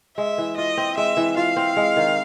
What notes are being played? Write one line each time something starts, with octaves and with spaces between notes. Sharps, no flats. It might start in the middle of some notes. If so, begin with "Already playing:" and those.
G#3 E5
E3
F4 D#5
C4
G#3 E5
E3
F4 F5
C4
G#3
D#3